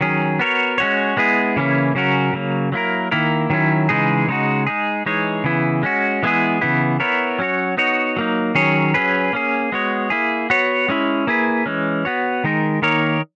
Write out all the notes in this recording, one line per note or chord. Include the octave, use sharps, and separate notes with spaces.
D#3 F#3 C#4 G#4
B3 F#4 A#4 C#5
G#3 C#4 F#4 C#5
G#3 B3 E4 G#4
C#3 E3 A#3 C#4 E4
C#3 F#3 C#4 F#4 A#4
C#3 F#3 A#3
F#3 A#3 E4 A#4
D#3 A#3 E4 A#4
D#3 F#3 C#4 E4
C#3 E3 G#3 D#4 G#4
C#3 G#3 D#4 F#4
G#3 D#4 G#4
E3 G#3 D#4 G#4 C#5
C#3 E3 B3 E4
G#3 C#4 F#4
E3 G#3 B3 E4 G#4
C#3 E3 B3 E4
B3 E4 A#4 C#5
F#3 C#4 F#4 C#5
B3 D#4 F#4 C#5
F#3 A#3 D#4
D#3 F#3 C#4 G#4 C#5
F#3 C#4 G#4 B4
A#3 C#4 G#4
G#3 B3 F#4 C#5
A#3 E4 G#4
B3 F#4 C#5
G#3 C#4 E4
A#3 E4 G#4 B4
E3 G#3 C#4
B3 F#4 C#5
D#3 G#3 D#4 A#4
D#3 A#3 D#4 A#4 C#5